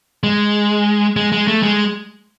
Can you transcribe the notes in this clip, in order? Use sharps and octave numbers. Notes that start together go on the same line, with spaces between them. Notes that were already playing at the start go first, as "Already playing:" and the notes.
G#3
G#3
G#3
A3
G#3